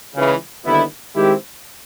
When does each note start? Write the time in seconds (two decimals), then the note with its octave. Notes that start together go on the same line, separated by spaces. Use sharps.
0.15 C#2 C#3 E3
0.65 D#2 D3 G3 B3 E4
1.15 D#3 G#3 C4 E4 G4